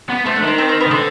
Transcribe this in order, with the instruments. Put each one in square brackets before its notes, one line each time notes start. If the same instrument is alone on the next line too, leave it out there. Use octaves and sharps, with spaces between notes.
[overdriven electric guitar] B3
[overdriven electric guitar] A3 [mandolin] C4
[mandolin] D4
[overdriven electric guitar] D#3
[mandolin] C4
C4
C4
B3
[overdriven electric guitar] D#3
[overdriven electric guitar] D3 [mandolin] C4